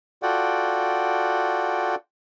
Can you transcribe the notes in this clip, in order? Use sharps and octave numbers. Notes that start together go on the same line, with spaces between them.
F4 F#4 A4 D5 F#5 G5